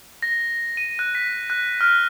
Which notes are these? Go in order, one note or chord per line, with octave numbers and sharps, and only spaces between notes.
A#6
D#7
F#6
B6
F#6
F6